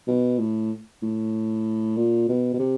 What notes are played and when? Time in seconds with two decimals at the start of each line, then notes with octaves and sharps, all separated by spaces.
0.07 B2
0.39 A2
1.02 A2
1.97 A#2
2.29 B2
2.53 B2
2.59 C3